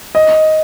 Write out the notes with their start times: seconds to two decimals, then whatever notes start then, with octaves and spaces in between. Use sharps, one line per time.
0.15 D#5